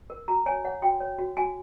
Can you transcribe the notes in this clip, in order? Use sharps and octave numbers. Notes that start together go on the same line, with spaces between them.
A#4
F#4 A#5
C#5 G#5
C#5 F#5
F#4 G5
C#5
F#4
F#4 G#5